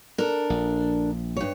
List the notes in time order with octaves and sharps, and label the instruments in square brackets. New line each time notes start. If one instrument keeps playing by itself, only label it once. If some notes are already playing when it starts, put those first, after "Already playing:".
[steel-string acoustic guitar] D4 A4 A#4
[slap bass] A#1
[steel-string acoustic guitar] G2 C#5